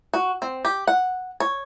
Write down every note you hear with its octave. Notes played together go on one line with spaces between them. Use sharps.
F#4
C4
G4
F#5
C#5